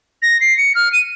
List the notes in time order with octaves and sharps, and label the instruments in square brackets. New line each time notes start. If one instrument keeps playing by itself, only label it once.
[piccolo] A#6
C7
C#7
F6
D#7